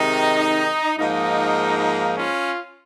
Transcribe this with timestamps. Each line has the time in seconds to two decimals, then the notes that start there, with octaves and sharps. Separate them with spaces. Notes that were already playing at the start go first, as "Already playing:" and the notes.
Already playing: C3 D#3 G#3 D#4
0.99 G#2 F3 A#3 D#4
1.77 D#4
2.17 C#4 F4